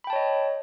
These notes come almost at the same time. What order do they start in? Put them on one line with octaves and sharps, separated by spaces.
B5 G5 A5 C#5 D#5